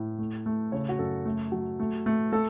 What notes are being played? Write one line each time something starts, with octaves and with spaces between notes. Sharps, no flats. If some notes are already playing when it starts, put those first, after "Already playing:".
Already playing: A2
A3
A3
C#3 C#5
F#4
F#2 A4
A3
F#3
A3
A3
A3 A4